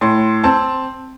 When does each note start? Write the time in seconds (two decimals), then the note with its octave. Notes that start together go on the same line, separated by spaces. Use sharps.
0.01 A2 C6
0.44 C4 A5